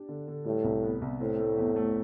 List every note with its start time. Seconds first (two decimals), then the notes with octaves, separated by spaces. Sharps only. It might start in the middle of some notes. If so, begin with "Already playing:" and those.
Already playing: D4 G4
0.09 D3
0.28 D3
0.45 A2 G3
0.64 C2
0.83 B3
1.02 C2
1.20 A2 C4
1.39 A3
1.58 E2
1.76 A3